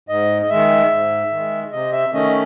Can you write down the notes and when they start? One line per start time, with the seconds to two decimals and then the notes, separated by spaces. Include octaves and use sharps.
0.09 G#2 D#5
0.42 D#5
0.50 D#3 G#3 E5
0.91 G#2
1.31 D#3 G#3
1.72 C3 D#5
1.92 E5
2.13 D#3 A3 C#4 D#5